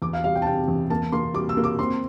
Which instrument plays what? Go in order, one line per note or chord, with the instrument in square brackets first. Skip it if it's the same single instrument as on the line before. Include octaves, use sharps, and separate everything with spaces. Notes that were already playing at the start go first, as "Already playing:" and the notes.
[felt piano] E2 D6
F5
G3 F5
G5
A5
C3 G5
E2
A#3 A5
A#3 C6
G3 D6
E6
A#3
D6
C4 C6